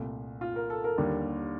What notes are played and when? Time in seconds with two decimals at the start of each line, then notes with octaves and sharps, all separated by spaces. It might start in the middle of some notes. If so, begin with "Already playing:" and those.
Already playing: C2 A#2 A3
0.41 F4
0.56 A#4
0.70 A4
0.84 A#4
0.98 D#2 D3 G3